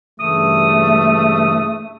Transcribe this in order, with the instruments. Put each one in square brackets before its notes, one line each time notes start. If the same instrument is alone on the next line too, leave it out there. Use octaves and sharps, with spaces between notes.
[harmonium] G2 C#3 E3 [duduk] A3 [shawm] D#6